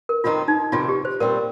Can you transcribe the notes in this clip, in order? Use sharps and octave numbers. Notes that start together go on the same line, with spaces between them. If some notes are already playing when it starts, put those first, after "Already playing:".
A#4
F2 D#3 C4 D#4 F4
D#4
F2 C3 D#3 F4
G4
C5
A#2 G3 C4 A#4